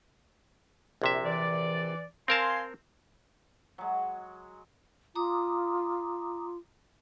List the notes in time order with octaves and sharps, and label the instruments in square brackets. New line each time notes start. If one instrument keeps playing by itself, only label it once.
[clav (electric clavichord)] A#1 C3 E5
[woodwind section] E3 D5
[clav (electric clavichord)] C4 A#4 A5 [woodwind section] F5 G#5 C6
[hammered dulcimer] F#3 G#3
[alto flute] F4 [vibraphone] A#5 D6 D#6